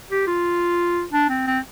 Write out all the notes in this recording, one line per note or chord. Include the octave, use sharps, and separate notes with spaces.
G4
F4
D4
C4
C4